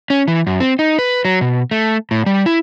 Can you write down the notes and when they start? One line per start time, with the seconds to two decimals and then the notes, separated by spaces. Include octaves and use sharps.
0.10 C#4
0.28 E3
0.47 F#2
0.60 C4
0.79 D#4
0.99 B4
1.25 F#3
1.41 B2
1.71 A3
2.11 A2
2.26 G3
2.46 E4